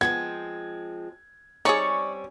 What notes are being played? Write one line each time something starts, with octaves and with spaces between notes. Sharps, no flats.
F3 G#3 B3 C4 G#6
G3 C4 C#4 D#4 G#4 C#5 D5 C#6